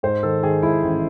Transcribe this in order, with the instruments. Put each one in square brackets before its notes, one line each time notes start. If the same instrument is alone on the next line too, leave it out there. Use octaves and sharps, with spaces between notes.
[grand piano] G#2 C5
D#3 A4
D#3 G#4
G#2 E4
A1